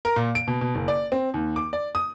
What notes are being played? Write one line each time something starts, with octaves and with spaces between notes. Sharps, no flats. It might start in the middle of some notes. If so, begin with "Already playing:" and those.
A#4
A#2
D7
B2
B2
F#1
D5
C4
D#2
D6
D5
D#6